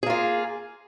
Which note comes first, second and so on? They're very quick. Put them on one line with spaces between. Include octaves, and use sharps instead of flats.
G#4 A#3 F4